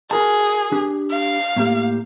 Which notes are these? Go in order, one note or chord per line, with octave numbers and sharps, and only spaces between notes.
F#4 G#4 A#4 A5
D4 G4
F5
A2 A#3 G4